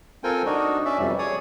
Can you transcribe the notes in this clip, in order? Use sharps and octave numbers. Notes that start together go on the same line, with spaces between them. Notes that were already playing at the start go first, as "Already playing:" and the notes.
C4 F4 A4 A#4 G5 G#5
D4 D#4 F#4
C#4 D5 E5
F2 B2 G3
G#4 C#5 D5 D#6